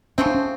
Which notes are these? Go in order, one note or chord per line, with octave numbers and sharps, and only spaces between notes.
C#3 F3 A3 C4 C#4
D4
C#4